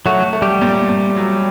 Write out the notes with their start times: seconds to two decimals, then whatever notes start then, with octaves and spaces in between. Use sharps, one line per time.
0.06 F#3 A3 F#4
0.33 A3
0.42 G3 G4
0.61 A#2
0.89 A#2
1.16 F#3